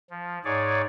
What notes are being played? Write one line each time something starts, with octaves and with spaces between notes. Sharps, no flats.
F3
G#2 G#4 C#5 D5